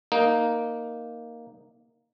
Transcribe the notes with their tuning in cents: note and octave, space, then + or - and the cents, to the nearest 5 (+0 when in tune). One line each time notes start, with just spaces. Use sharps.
A#3 +0 D#4 +0